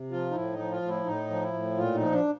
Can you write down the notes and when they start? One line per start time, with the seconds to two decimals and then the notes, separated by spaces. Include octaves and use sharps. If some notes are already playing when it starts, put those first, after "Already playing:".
Already playing: C3
0.11 F3 F4
0.31 D#4
0.35 A2 E4
0.53 D#4
0.59 F3
0.71 F4
0.82 A2
0.89 E4
1.06 A2 D#4
1.30 F3
1.42 E4
1.53 A2
1.77 A#2 F4
1.95 D#4
2.00 F3
2.12 D4